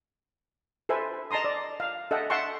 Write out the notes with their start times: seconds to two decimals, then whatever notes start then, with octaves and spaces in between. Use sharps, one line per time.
0.89 A4 B4 C5 E5 G#5
1.31 D#5 A5 A#5 C6 D#6
1.44 D5
1.80 F5
2.11 A4 D#5 E5 F#5 G5
2.30 E5 F#5 G5 A5 C6 C#6